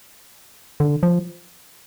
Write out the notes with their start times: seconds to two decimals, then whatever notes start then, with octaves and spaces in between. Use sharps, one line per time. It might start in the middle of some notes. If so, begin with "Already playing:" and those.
0.80 D3
1.03 F3